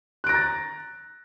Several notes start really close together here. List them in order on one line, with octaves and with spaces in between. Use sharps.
F#6 D7 A#6 A#5 A6